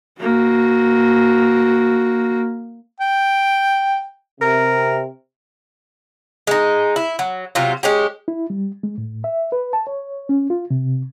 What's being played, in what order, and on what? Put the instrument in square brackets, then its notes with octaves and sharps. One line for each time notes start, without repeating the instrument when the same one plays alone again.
[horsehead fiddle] A#3 F#4
[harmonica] G5
[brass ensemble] C3 [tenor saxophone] A#4
[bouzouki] G#3 D#4
E4
F#3
C3 F#3 F4
G#3 C#4 G4
[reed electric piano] E4
G3
G#3
A2
E5
B4
A5
C#5
C#4
F4
C3